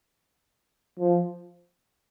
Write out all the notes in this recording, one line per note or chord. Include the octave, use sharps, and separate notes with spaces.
F3